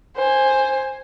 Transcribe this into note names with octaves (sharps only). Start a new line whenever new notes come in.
C5 G#5